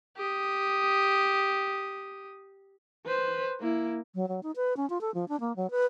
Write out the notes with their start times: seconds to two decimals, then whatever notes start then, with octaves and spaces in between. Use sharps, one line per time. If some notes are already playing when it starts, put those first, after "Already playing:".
0.17 G4 D#6
3.06 B4 C5
3.60 A#3 E4
4.15 F#3
4.28 F#3
4.43 D#4
4.56 B4
4.77 C#4
4.90 F4
5.01 A4
5.14 F3
5.28 D4
5.40 A#3
5.56 F#3
5.71 B4